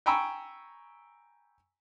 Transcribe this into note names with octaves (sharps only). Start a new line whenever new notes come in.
G5 G#5 A#5 B5 C#6 E6